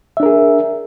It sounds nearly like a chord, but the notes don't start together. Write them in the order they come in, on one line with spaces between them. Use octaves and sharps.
E5 D4 A#4 G#4